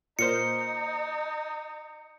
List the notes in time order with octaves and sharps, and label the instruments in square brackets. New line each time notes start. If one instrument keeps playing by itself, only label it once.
[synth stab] A#2 A#4 C5 [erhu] D#4 [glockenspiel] C#7